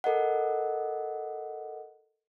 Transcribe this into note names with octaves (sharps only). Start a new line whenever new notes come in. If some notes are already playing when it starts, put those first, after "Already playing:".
A4 A#4 D#5 F#5